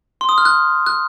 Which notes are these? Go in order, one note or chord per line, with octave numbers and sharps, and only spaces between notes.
C6
D#6
F6
F#6
F#6